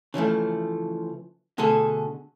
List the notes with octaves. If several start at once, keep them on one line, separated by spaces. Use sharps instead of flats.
C#3 E3 F3 A3
B2 D3 A3 G#4 A4